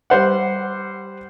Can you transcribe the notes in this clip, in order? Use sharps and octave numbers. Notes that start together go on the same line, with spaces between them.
G3 C5 F#5